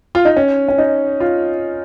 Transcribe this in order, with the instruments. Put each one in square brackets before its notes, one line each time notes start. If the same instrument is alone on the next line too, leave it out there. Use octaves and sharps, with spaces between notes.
[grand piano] F4
D#4
C#4
C#4
D#4
F4